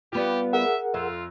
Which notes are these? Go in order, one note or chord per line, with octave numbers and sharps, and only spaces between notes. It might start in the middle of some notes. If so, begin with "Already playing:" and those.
G3 B3 F4 G4
G#4 A#4 E5 F#5
F2 F4 E5